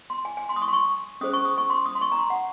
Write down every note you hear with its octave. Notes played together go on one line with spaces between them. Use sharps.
C6
G#5
G#5
C6
D#6
C#6
C6
C#6
C#4 G#4 C5 D#6
C#6
D#6
C#6
C6
D#6
C6
C#6
A#5
C6
F#5